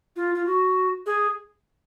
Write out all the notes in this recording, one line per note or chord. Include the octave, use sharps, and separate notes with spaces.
F4
F4
F#4
G#4